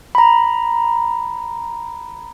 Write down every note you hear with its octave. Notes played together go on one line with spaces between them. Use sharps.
A#5 B5